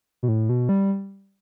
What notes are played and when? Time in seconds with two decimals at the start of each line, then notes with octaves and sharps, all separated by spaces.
0.23 B2
0.28 A2
0.49 B2
0.69 G3